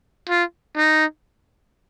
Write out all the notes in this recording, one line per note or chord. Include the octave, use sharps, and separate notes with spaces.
F4
D#4